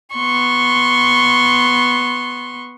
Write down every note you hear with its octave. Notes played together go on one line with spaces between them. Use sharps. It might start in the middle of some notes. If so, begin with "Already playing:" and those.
B3 C6 C#6